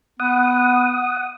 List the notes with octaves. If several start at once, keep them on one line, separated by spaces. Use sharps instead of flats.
B3 F#5 D#6